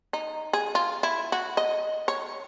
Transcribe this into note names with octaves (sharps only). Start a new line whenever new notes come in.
D#4
G#4
F4
E4
F#4
D#5
C#5